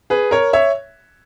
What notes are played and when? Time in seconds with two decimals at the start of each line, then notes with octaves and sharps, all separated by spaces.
0.10 G#4 B4
0.31 A#4 C#5
0.53 C#5 E5